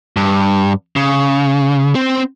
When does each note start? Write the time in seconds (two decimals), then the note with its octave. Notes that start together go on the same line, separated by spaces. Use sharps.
0.16 G2
0.96 C#3
1.95 C4